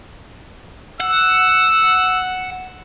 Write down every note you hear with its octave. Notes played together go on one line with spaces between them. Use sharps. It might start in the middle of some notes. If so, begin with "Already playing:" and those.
F#5 E6